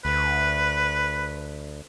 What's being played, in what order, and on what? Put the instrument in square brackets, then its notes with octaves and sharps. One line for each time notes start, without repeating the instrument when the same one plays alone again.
[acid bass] D2 [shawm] B4